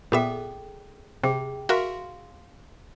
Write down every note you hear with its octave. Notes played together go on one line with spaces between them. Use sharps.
A#2 B3 G#4 A4 E5 G5
C3 G#4 G5
F#4 A#4 E5 F5 C6